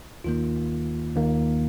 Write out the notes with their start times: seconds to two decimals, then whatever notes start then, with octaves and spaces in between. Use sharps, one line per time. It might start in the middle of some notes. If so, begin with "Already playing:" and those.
0.24 D#2 D#3 A#3 F4
1.16 D#2 D#3 A#3